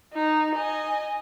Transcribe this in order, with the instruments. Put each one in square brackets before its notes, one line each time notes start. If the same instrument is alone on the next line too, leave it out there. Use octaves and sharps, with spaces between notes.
[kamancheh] D#4
D#5 G#5